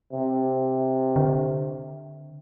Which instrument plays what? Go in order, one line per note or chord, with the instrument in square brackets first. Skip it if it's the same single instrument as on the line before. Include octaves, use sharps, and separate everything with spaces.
[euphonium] C3
[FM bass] D3